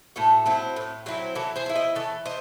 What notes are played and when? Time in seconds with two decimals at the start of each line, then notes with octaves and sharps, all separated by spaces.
0.16 A2 F#4 A4
0.46 F#3 C4 E4
0.76 A2
1.06 F#3 C4 E4
1.35 E3 F#4 A4
1.56 G#4 C5
1.66 C4
1.69 E4
1.75 C5 D#5
1.95 E3 A4 C#5
2.26 C5 D#5